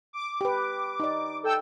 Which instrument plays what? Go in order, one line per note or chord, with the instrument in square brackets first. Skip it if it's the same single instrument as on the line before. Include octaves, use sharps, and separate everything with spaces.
[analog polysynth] D6
[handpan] G4 B4
D#4 D5
[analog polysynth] A4 G5 E6